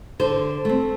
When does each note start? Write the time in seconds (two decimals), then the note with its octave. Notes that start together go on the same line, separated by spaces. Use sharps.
0.19 D3 C5
0.65 A3 C4